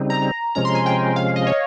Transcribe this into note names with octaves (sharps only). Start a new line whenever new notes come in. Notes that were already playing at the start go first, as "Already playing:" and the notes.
Already playing: C#3 G3 C4 D#4
A#5
C3 F3 G#3 C#4 A#5
C6
G#5
G5
F5
D#5
C#5